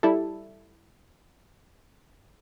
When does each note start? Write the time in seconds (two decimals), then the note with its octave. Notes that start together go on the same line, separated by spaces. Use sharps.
0.03 G3 E4 A4